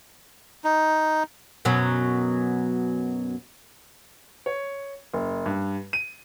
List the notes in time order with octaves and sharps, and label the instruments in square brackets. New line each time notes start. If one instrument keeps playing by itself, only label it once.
[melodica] D#4
[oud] F#2 B2 F#3
[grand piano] C#5
F#1
G2
D#7